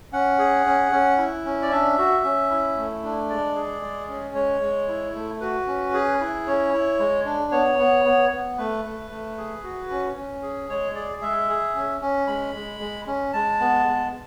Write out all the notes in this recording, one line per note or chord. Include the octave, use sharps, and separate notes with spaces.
C#4 F#5
G#4
C#4
C#4
E4
C#4
D5
D4 E5
F#4
C#4
E4
A3
D4
G#3 D5
G#4
G#3
C#4
G#3 C#5
G#3
E4
A3
F#4 B4
C#4
G#4
E4
C#4 C#5
E4
G#3
D4
B3 C#5
B3
B3
B3
A3 B4
A3
A3
G#4
F#4
C#4
C#4
G#4
G#3 C#5
G#4 D5
G#3 E5
G#4
C#4
C#4
G#3 B5
G#3
G#3
C#4
G#3 A5
B3
G#3